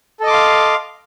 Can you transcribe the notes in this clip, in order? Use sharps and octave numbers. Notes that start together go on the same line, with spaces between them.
A4 D#5 F5 C6 D6